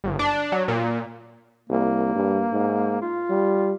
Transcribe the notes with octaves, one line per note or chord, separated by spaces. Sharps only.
G1
D4
F#3
A#2
C2 A#3
G2
G#2
F4
G3